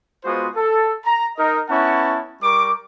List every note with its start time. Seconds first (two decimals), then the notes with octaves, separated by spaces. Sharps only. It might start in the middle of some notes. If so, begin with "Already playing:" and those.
0.24 G#3 B3 F4 F#4 C5 D#6
0.56 A4
1.05 A#5
1.37 D#4 A#4 D#5
1.69 B3 C#4 E4 F#5 A5 C#6
2.42 G3 A#4 C#6 D6